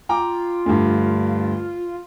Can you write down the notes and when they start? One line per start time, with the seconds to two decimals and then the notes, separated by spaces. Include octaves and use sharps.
0.09 F4 G5 A#5 D6
0.66 D2 G2